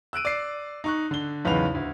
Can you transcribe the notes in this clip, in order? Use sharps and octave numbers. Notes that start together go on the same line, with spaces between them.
E6 F#6 D7 D#7
D5 C7
D#4 C#6 F#6
D3 G7
B1 E2 C#3 B4 B5 F7
D2